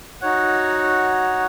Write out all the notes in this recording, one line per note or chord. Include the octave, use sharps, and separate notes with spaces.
D#4 F#4 C#5 F#5